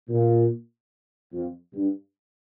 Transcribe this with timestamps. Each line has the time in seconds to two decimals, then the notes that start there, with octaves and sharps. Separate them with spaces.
0.09 A#2
1.33 F2
1.74 G2